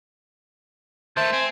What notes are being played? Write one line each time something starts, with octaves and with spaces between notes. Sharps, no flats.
D#3 A3 C5 E5 A5
C4 G#5